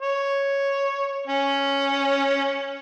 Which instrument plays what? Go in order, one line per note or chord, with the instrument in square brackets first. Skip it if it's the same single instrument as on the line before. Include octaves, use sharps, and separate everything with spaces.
[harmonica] C#5
C#4